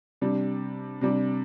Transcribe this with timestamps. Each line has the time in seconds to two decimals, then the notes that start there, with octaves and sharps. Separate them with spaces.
0.22 C3 G3 D4
1.01 C3 G3 D4